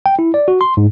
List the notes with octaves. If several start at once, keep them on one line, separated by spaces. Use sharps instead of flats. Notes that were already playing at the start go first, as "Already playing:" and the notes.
G5
E4
D5
F#4
C6
G#2